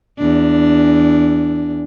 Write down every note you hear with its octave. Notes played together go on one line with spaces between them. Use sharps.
E2 D4